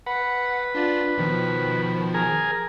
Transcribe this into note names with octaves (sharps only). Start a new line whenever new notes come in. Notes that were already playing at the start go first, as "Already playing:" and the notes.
B4 F#5
D4 F4 D5
B2 D#3 F3
G#4 A#4